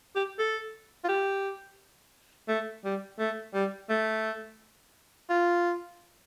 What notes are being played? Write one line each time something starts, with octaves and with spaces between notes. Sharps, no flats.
G4
A4
F4
G4
A3
G3
A3
G3
A3
F4